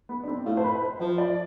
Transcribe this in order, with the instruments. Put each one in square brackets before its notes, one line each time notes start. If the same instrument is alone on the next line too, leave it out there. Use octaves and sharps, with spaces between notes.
[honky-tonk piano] B3
D4
C4
[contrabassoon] A2 [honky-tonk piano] F4
[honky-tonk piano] C5
B4
C5
[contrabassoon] F3 [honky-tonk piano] C5
[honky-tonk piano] D5